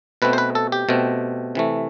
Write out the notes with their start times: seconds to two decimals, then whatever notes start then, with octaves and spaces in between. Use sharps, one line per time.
0.22 B2 A3 C4 B4
0.33 C5
0.38 B4
0.55 A4
0.72 G4
0.89 B2 A3 C4
1.55 C3 E3 A3